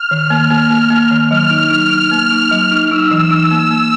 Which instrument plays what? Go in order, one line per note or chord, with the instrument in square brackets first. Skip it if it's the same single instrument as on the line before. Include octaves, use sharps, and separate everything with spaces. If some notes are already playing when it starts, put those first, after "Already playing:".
Already playing: [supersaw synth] F6
[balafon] D#3
A#3
A#3
A#3
A#3
D#3
[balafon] F#3 [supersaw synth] F6
[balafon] D#4
D#4
D#4
A#3
D#4
F#3
D#4
[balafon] D#4 [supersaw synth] E6
[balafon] E3
D#4
A#3
A#3